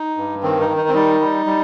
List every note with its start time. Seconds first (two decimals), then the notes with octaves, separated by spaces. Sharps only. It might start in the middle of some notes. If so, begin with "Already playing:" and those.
Already playing: D#4
0.17 G2
0.43 D#3 C4
0.60 D#4
0.69 D#3
0.77 D#4
0.89 C4
0.94 G3 D#4
1.21 G3
1.46 G3